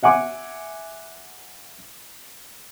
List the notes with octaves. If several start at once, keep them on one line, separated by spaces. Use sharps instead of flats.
E5 F#5 G#5 D6